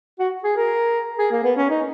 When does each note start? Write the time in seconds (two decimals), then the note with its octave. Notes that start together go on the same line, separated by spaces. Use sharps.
0.19 F#4
0.44 G#4
0.57 A#4
1.19 G#4
1.32 A#3
1.44 B3
1.57 C#4
1.70 D#4